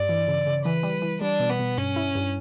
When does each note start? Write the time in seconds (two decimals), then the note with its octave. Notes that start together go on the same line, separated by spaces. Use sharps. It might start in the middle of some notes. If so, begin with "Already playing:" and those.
Already playing: G2 D5
0.09 E3
0.28 C#3
0.47 C#3
0.65 E3 B4
0.83 G3
1.02 E3
1.21 G3 D4
1.40 B2
1.50 B3
1.60 B2
1.77 G2 C#4
1.96 E4
2.15 G2